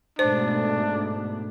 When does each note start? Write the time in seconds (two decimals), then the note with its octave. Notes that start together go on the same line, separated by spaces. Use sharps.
0.19 G#2 B2 A3 D4 C5